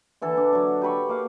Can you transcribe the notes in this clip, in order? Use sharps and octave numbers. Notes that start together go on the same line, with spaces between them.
D3 E3 A4
D4
F#3 D4
G4 B4 B5 C#6
A#3 F5 F#5